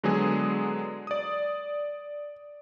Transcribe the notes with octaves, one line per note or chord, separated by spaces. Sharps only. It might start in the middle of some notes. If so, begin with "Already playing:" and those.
D3 F#3 G#3 B3 G#4
D5 D#6